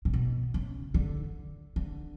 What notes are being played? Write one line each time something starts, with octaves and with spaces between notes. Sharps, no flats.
A#2
B2
C#3
D3
D3